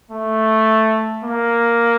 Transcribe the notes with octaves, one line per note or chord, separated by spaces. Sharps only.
A3
A#3